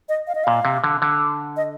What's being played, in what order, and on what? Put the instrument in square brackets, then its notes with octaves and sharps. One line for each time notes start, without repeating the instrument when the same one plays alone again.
[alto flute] D#5
F5
D#5
[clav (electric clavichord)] A#2 [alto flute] F5
[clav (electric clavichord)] C3
D3
D3
[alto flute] D#5